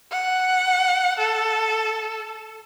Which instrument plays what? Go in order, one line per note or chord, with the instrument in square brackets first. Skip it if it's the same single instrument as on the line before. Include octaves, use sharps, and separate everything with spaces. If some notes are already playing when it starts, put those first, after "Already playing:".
[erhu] F#5
A4